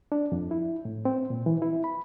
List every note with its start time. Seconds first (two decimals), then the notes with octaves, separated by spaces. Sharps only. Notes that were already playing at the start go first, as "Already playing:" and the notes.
0.12 D4
0.32 F2
0.51 E4
0.85 A2
1.05 C4
1.30 A#2
1.46 E3
1.62 E4
1.84 B5